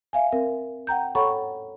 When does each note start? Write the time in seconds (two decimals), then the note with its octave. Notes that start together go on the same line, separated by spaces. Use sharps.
0.13 E5 F5 G#5
0.32 C4 A#4
0.87 F#5 G5 A#5 G6
1.15 A4 C#5 F#5 A#5 B5 C#6